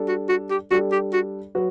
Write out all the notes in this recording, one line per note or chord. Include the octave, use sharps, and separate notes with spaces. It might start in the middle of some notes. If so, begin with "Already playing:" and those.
Already playing: G3 D4 A4
F#4
F#4
G4
G3 D4 F#4 A4
G4
F#4
F#3 F#4 B4